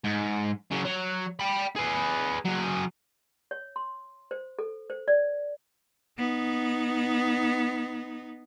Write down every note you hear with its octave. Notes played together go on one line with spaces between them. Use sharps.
G#2
C#3 F#3
F#3
G5 B5
G#4 B4
F#3 G#4
C#5
C6
C5
A4
C5
D5
B3 D#4